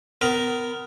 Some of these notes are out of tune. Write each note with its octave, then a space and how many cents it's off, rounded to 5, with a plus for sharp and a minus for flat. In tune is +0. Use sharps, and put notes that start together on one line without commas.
B3 +30 A#4 +0